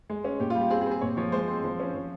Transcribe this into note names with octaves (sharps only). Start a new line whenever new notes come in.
G#3
C#4
A#2 G4
F4
G3
G4
C4 G#4
G#4
C4
G#4
A#2 C#5
F3 C#5
G#3 C5
C4 C5
F3
C#4
F3